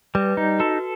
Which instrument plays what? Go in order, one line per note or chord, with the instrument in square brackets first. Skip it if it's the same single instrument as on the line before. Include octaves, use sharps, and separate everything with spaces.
[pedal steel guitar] G3 [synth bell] B4
[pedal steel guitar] D#4
[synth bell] F#4 [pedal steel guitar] A4